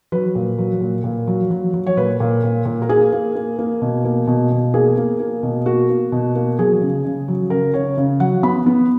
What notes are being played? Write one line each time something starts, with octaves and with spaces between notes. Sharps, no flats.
F#3 B4
A#2
F#3
A#2
A#2
F#3
F#3
F#3
C#5
A#2 B4
A#2
A#2
A#2
A#4
A#3 G#4
A#3
A#3
A#3
B2
A#3
B2
B2
A#3 G#4
A#3
A#3
B2
A#3 F#4
A#3
B2
A#3
F#3 G#4
C#3
C#3
F#3
C#3 A#4
C#3 C#5
C#3
F#3 F#5
B3 B5
B3